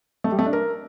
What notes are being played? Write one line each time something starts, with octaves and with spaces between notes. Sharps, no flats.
A3
G3
A3
D4
A#4